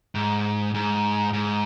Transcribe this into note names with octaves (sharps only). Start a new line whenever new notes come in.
G#2
G#2
G#2